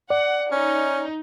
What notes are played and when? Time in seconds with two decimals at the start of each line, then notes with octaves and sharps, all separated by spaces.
0.10 D5 F#5
0.52 C#4 D#4